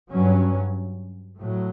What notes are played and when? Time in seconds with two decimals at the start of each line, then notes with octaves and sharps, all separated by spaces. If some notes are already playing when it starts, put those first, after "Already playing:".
0.11 G2 F#3 C#4
1.38 A2 F#3